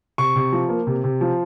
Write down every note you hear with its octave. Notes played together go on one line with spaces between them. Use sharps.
C3 C#6
C3
F3
A#3
C3
C3
F3